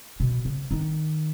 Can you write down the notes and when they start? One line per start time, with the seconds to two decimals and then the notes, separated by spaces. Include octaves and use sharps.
0.20 B2
0.45 C#3
0.71 D#3